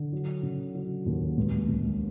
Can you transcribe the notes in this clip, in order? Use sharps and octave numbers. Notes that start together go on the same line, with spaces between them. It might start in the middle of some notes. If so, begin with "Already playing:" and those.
Already playing: D3
F#3
C#3
F#3
D#2
C#2
C#2